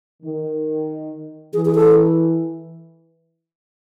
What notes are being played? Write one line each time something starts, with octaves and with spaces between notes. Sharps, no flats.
D#3
E3 G#4
G#4
A4